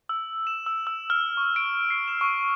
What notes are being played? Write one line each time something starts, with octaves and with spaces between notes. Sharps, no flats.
E6
E7
E6
E6
F6
C#6
D7
C7
E7
C#6